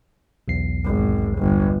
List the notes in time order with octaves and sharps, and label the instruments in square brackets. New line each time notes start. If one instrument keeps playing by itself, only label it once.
[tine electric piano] B1 E2 C7
[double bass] G#1
G1